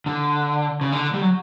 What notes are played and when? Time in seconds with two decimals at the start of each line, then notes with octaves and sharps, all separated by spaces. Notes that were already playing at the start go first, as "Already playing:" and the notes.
0.06 D3
0.81 C#3
0.92 D3
1.14 G3
1.21 F#3